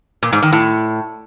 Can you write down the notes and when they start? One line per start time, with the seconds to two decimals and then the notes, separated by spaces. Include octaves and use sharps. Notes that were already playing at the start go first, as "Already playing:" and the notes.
0.23 A#2
0.33 G#2
0.43 D#3
0.52 A2